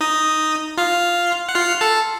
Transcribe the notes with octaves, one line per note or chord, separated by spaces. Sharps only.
D#4 D#5
F4 F5
F#5
F4 F5
A4 A5